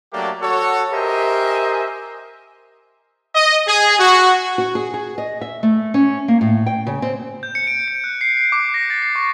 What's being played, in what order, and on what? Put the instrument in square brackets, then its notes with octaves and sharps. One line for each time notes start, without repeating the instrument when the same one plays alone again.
[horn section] F#3 A3 A#3 D4 G4 D5
F#4 A4 C#5
G4 A#4 C5 D#5 E5 G#5
D#5
G#4
F#4
[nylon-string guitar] F#4
G#4
G#4
D#5
E5
A3
C#4
A#3
A2
G5
C#3
C4
[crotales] G6
C#7
D7
C#7
F#6
C7
C7
D6
A#6
A6
C7
C#6